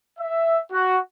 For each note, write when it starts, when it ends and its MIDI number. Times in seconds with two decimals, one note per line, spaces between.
0.19 0.58 76
0.72 0.97 66